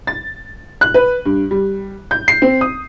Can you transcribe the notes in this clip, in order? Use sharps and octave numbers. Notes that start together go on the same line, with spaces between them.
A6
F#6
B4
G2
G3
G6
C7
C4
D#6